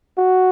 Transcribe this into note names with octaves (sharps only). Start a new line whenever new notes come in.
F#4